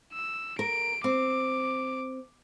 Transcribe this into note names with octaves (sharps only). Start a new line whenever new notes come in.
E6
A#4 D7
C4 D6